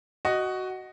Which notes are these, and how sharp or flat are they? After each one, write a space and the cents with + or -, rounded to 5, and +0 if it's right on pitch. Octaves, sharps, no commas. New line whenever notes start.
F#4 +10 D#5 +0